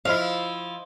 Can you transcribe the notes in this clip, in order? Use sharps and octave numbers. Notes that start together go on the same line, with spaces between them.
F3 E4 C5 D#5 F5